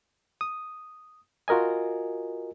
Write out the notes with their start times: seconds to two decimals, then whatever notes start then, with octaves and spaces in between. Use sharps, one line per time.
0.41 D#6
1.48 F4 F#4 A#4 D#5 G#5